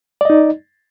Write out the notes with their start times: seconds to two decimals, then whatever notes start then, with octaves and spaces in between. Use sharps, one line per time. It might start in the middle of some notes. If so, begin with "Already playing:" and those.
0.21 D5
0.25 D#5
0.30 D#4